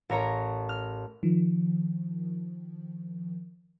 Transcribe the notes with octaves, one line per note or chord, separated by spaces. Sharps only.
A1 A#4 C#5 A#5
F6
D#3 F3